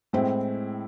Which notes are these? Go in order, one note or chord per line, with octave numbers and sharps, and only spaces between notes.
A2 G#3 C4 E4